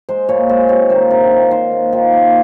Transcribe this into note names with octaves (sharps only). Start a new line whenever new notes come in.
G#3 C5
A#2 C#5
G#3 C5
C3 C#5
D#3 A#3 C5
C3 A#4
D#3 A#3
D#3 C5
A#3
D#3 F4
A#3